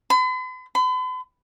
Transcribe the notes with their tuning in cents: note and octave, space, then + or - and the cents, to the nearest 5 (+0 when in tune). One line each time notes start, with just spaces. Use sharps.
B5 +45
B5 +45